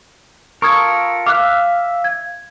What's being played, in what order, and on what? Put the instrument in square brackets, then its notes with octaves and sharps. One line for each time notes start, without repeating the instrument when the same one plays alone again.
[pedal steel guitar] F4 A4 A#4 [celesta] C#6 D#6 G#6
[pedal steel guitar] E5 F5 [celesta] D6 F#6
[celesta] G#6